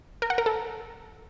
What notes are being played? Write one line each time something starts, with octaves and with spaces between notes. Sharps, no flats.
A#4
F#5
A#4
A4